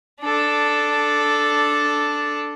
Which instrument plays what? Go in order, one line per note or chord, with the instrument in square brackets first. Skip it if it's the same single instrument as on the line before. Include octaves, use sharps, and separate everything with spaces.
[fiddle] D4 A4